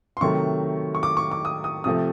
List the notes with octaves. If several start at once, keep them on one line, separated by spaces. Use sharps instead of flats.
C6
C3 D#3 F#3 A3 C#6
C#6
D6
C#6
D6
D#6
D#6
C3 F3 A3 D#6